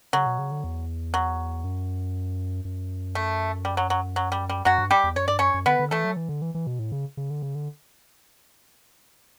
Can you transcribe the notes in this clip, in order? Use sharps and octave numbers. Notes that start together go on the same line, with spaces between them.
C#3 F#3
B2
C#3
D3
E2
F#3
F#2
F#2
A3
G3
F#3
F#3
F#3
G3
G3
F#2 F#3 F#4
G2
G3 G4
E2
F#2 C#5
G2 D5
F#2 C#4 C#5
F#2
D3 B3 B4
D3
E3 A3 A4
F#3
E3
D3
E3
E3
B2
A2
C#3
C#3
D3
C#3
D3